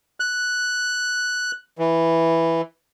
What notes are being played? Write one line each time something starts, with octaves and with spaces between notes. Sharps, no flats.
F#6
E3